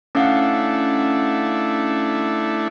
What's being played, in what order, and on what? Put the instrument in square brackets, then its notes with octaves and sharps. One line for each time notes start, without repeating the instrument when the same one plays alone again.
[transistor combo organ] A3 D4 E4 [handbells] C#4 F5 F#5